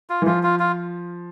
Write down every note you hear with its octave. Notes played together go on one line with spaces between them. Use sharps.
F4
E3
F3 F4
F4
F4